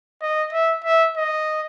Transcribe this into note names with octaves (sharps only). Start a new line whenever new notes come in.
D#5
E5
E5
D#5